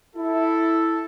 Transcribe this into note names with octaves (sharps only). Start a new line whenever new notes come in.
E4 A4